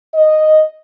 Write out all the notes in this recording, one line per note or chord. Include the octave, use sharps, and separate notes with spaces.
D#5